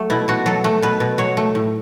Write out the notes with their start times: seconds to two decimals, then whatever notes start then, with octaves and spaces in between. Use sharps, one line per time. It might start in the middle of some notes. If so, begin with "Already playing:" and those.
Already playing: F#3 A3
0.10 B2 E4
0.28 B2 F#4
0.46 F#3 A4
0.64 A3
0.82 B2 B4
1.00 B2
1.18 F#3 C#5
1.37 A3
1.55 A2